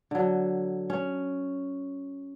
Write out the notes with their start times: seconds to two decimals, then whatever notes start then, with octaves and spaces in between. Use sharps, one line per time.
0.11 D3 F#3
0.90 C#4